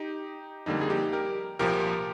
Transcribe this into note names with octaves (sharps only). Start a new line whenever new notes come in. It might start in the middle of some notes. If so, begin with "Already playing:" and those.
Already playing: D#4 G4
F2 D3 G3 A#3 D#4
G#4
D#4 G4
G4 A#4
C2 A#2 F3 G4 A#4